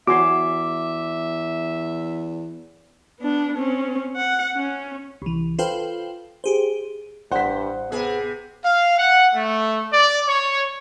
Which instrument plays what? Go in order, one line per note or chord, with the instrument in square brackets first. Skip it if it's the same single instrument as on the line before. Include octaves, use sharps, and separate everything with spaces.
[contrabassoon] E2 [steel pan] F#4 G#5 C6 [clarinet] E5 [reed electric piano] D6
[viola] B3 D4
C4 C#4
F#5
C#4
[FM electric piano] C2 E3
F4 A4 B4 C5 F5 G5
G4 G#4 C5
[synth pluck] A1 [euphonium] G2 [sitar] C5 [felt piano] F#5 B6
[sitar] C3 G#4 [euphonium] B3
[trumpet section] F5
F#5
A3
D5
C#5